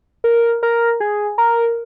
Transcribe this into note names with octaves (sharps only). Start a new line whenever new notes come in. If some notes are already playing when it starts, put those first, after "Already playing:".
A#4
A#4
G#4
A#4